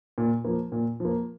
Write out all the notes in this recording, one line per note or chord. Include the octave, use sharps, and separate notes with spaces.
A#2
F3 A#3
A#2
F3 A#3